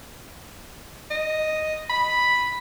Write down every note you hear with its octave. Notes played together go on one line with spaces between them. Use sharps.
D#5
B5